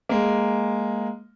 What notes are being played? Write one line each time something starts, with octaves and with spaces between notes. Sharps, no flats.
G#3 A#3